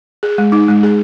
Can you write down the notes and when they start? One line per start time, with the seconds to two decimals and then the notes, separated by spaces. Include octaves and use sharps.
0.23 G#4
0.38 G#3
0.52 D#4
0.68 G#3
0.83 G#4